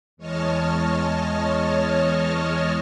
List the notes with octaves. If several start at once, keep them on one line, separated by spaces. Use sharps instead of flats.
E2 G#3 C#5 D#5 A5 F6